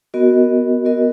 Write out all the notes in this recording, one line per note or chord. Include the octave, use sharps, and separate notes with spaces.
B3 F#4 A#4 D#5
B3 F#4 A#4 D#5